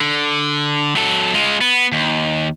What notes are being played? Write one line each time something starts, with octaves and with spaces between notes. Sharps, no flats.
D3
F#3 A4
G#3 F4
B3
D#2